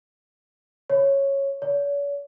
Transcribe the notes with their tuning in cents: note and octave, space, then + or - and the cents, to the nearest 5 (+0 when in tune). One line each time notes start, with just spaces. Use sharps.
C#5 -10
C#5 +45